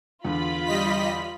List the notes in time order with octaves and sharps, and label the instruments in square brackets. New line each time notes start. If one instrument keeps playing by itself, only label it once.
[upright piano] E2 D3 [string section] F4 B5
[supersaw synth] G3 D#5 B6